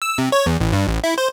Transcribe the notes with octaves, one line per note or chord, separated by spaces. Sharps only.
E6
C3
C#5
E2
A1
G2
A1
E4
C5